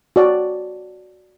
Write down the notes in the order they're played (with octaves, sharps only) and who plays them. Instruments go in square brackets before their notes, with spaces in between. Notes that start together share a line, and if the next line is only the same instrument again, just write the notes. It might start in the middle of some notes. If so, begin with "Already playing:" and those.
[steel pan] F#4 D5